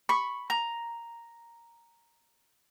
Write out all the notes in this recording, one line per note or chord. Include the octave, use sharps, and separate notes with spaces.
B5 C#6
A#5